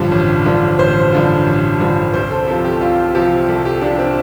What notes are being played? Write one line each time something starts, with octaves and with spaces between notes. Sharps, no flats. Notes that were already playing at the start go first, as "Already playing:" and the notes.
Already playing: A1 G2 D3 F3 G4
A1
G2 D3 F3
A1 C5
G2 D3 F3
A1
G2 D3 F3
C2 C5
A4
C3 F3 A4
G4
C2 F4
C3 F3 G4
C2 A4
G4
C3 F3 D4
C4